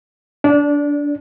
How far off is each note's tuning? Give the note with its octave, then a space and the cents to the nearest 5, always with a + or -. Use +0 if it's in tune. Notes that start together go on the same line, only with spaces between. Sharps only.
D4 -20 D5 +0